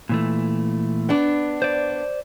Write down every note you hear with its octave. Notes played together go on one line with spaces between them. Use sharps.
A#2 E3 A3
B3 D4
C5 D5